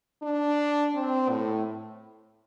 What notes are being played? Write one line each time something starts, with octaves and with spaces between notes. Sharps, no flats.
D4
C4
A2